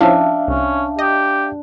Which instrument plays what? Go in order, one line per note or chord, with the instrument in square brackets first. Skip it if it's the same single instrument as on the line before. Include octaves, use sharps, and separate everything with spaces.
[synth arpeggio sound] F3 C#4 E4 [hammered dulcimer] D4 [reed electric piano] E5 F5
[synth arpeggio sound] C2 [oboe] C#4
[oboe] G4 [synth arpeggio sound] D#5